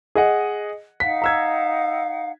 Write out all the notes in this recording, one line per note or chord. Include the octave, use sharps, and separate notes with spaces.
G#4 D#5 F#5
D#4 F5 F#5 B6
A#5 E6 G#6